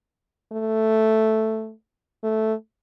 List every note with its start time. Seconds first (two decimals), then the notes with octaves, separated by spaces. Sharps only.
0.52 A3
2.24 A3